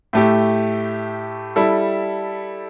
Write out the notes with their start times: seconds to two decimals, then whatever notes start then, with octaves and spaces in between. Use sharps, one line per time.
0.13 A2 A3 G4
1.56 G3 E4 A4